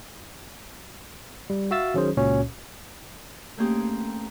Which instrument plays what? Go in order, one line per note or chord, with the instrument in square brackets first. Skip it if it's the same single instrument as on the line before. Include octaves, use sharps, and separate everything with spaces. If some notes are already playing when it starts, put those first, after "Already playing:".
[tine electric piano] G3
F#4 E5 F5 E6 A6
D#3 F#3 C#4 G#4 C5
C#2 A#2 C#4 F#4 C#5
[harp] A3 A#3 C4 C#4 G4 G#4